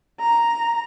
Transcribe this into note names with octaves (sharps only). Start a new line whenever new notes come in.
A#5